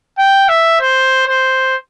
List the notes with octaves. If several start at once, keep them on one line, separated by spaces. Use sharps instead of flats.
G5
E5
C5
C5